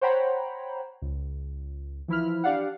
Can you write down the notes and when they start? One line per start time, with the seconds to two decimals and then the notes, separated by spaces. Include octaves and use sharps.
0.01 C5 C#5 F#5 G5 A#5 B5
1.02 C#2
2.08 E3 F3 E4 B5 F6
2.44 D4 G4 D5 F5 F#5